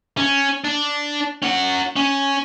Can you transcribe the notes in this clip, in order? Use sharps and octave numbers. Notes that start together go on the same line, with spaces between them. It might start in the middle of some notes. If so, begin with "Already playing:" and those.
C#4
D4
C#4 F#5
C#4